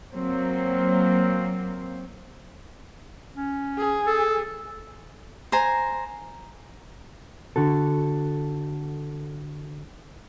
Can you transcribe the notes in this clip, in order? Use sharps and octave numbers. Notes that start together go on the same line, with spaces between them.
F#3 A#3 C4
C#4
G#4
A4
C5 G#5 A#5
D3 F#4 A4